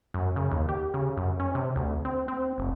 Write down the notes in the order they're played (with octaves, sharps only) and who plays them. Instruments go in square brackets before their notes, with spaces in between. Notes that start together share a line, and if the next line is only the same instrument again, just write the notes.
[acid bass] F#2
C#3
D#2
G4
C#3
F#2
C#4
C3
D2
C4
C4
F1